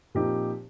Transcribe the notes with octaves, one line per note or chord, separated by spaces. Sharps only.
A#2 F3 C4 D#4 G4